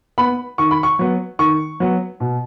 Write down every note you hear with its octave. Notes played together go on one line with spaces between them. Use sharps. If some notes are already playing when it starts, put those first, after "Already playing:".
B3 B5
D#3 C#6
B5
C#6
F#3 B3
D#3 C#6
F#3 B3
B2